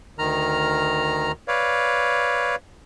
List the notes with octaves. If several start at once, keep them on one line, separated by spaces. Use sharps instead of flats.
D2 D#3 A#5 F6
B4 C#5 D5 F5